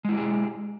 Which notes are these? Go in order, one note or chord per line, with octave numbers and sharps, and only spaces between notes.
G#3 E4 G4 G#4